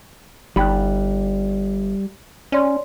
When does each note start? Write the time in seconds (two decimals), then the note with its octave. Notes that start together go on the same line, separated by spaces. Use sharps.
0.56 G1 G3 D#4 G5 B5 F#6
2.52 C#4 C#5 D5 C6